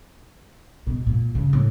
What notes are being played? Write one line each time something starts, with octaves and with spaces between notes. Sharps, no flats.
B2
A#2
C#3
A2